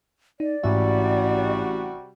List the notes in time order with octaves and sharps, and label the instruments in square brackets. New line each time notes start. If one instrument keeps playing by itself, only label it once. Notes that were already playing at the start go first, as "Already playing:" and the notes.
[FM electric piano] D#4 [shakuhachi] D5
[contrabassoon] A1 [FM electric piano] G#2 E5 [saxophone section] C3 G3 F#4